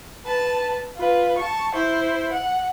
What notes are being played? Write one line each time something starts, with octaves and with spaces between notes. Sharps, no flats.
B4 A5
F4 B4
A5 C#6
E4 C5
F#5